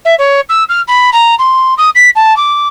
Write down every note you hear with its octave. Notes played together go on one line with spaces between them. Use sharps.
E5
C#5
E6
F6
B5
A#5
C6
D#6
B6
A5
D6